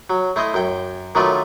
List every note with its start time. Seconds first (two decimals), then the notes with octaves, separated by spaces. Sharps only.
0.10 F#3
0.36 A3 E4 C5 D#5
0.54 F#2 G5
1.15 D#3 F#3 A3 F4 B4 D5